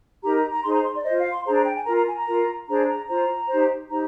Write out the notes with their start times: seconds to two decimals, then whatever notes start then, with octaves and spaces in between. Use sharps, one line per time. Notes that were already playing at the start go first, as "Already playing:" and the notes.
0.23 D#4 G4 A#4 A#5
0.36 A#5
0.51 A#5
0.64 D#4 G#4 C5 C6
0.74 A#5
0.84 C6
0.95 D5
1.04 F4 C5 D#5
1.18 F5
1.31 C6
1.45 D4 G#4 C5 A#5
1.55 A#5
1.66 G5
1.76 G#5
1.86 F4 A#4 A#5
1.96 A#5
2.07 G#5
2.17 A#5
2.27 F4 A#4
2.67 D4 G#4 C5 A#5
2.88 A#5
3.08 F4 C5 A#5
3.49 D#4 G4 C5
3.89 D#4 G4 C5 A#5